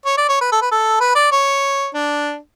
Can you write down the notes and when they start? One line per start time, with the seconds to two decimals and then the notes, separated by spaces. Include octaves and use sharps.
0.06 C#5
0.17 D5
0.29 C#5
0.41 B4
0.52 A4
0.62 B4
0.71 A4
1.00 B4
1.15 D5
1.32 C#5
1.94 D4